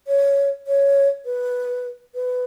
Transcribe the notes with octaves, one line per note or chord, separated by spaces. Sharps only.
C#5
C#5
B4
B4